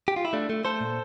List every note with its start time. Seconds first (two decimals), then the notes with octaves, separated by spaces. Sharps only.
0.08 G4
0.16 F4
0.25 E4
0.33 A3 D4
0.50 A3
0.65 A3 A4 C5
0.81 A#2